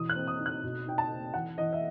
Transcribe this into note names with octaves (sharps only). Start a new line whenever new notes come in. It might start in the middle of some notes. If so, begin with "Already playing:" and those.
Already playing: B2 E3 D#6
F#6
C4
D#6
D#4
F#6
B2
D#4 G5
A5
C4
E3 F#5
E3 D#5
E5